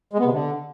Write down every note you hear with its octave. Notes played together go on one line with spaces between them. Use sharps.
G#3
B3
C3
D3